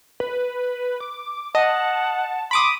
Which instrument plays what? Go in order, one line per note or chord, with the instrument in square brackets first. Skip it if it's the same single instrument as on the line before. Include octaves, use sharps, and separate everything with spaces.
[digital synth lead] B4
D6
[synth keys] D#5 [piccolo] F#5 [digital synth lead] A5
[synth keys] B5 D6 D#6 [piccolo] C6